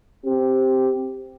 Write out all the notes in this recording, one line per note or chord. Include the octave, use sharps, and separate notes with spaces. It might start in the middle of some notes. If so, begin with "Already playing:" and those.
C4 G4